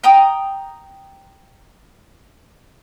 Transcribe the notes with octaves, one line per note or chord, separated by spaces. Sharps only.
G5 A#5 D#6